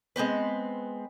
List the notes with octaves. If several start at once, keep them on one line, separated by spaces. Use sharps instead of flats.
G#3 B3 C4 B4